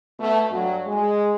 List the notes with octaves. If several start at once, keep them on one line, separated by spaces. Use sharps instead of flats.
B2 A3
G2 F#3
G#3